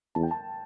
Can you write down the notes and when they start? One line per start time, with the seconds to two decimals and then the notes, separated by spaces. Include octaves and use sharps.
0.15 E2 A5
0.23 G5
0.31 A5